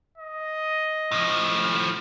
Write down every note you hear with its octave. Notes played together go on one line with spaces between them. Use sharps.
D#5
A2 F3